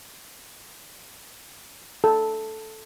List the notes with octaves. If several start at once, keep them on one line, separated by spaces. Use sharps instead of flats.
A4